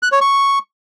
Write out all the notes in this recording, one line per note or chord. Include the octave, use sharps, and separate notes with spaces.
F#6
C#5
C#6